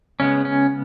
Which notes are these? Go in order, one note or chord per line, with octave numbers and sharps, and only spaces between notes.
C#3 G#3 B3 C#4
C#4